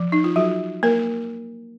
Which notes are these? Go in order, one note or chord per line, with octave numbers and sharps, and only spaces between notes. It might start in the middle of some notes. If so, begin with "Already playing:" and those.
Already playing: F3
D#4
F4
F#3 F#4
A#3 A#4